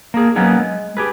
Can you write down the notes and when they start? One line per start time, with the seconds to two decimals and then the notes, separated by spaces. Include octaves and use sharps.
0.14 A#3 G#4
0.36 F#3 A#3 B3 C#4 D#4
0.59 G#3
0.97 G4 G#4 B4